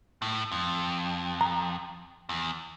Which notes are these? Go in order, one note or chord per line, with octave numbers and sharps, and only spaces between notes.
A2
F2
A#5
E2